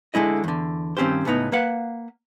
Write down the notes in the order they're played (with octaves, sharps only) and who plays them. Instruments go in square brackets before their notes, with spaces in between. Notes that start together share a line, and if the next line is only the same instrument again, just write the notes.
[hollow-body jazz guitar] D2 D3 G#3 E4 D#5
E2 D3
G2 D#3 C4 C#4 G4 C5
C#2 A2 B3 D#4
A#3 B4 F5 F#5